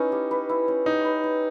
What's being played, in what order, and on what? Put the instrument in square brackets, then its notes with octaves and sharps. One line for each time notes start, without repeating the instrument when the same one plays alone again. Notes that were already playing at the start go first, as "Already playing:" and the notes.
Already playing: [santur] C#4 E4 B4 [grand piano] D#4
[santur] G4
B4
E4
C#4
[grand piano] D#4 [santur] G4
[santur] B4
E4